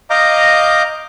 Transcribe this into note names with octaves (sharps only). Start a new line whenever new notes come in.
D#5 F5 A#5 D6 G6